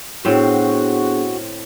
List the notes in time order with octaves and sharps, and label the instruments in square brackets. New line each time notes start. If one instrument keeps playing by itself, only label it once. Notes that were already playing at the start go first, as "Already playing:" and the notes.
[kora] A2 C4 C5 [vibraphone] B3 D4 G#4 [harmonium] F#4